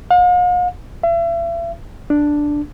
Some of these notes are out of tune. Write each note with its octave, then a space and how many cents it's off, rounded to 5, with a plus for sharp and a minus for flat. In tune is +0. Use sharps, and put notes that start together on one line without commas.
F5 +45
E5 +40
D4 +0